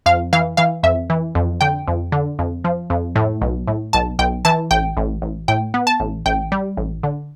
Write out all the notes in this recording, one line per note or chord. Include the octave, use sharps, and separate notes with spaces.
F2 F5
E3 F5
E3 F5
F2 E5
E3
F2
D3 G5
F2
D3
F2
F3
F2
A2
B1
A2
B1 A5
B1 G5
E3 A5
A1 G5
A1
A1
A2 G5
B3
A5
A1
A1 G5
G3
A1
D3